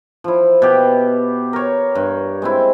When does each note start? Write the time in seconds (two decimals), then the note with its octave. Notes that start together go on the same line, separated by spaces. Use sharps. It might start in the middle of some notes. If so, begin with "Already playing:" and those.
0.24 F3 E4
0.62 B2 G4
1.53 A#4 C#5
1.95 G2
2.42 G#3 C4 E4